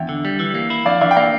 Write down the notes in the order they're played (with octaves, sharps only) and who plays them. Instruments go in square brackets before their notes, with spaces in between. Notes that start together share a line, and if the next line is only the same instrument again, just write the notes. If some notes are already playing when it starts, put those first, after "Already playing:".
Already playing: [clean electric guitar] E2 [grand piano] E5 G5
[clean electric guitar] D3
G3
E3
A#3
E4
[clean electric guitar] F2 [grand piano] D5 F5
[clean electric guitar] E3 [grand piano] D5 F5
[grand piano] G5
[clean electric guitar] A#3 [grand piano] D5 F5